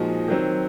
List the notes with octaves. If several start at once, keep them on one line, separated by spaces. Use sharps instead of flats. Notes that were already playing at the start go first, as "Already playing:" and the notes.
Already playing: A#2 F3 G#3 D#4 F#4
D#3 F#3 C4